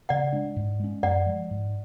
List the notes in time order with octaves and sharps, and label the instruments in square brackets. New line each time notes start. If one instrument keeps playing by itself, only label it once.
[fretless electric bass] C#3 [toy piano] D5 F#5
[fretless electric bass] G#3 D4
G#2
G#3 C#4
[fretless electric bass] F#2 [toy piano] D5 F#5
[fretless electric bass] F3 G#3
G#2